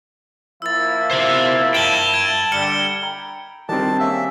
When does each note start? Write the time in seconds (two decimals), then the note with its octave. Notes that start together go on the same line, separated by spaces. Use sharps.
0.62 F3 A#3 E4 E6 A6
1.11 C5 E5
1.74 G5 A5 E7 F#7 G7
2.14 G#6 D7
2.52 D3 G3 F6 C#7 G7
3.02 G5 A#5 B5
3.69 D#3 G3 C4 D4 A5
4.00 A#3 C#4 G#4 E5